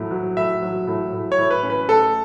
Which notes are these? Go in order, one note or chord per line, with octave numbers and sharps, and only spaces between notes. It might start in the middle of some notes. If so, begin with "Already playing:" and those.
Already playing: A2 F#3
F#3
A2 E5
F#3
A2
A2
C#5
A2
B4
C#4
B4
A3 A4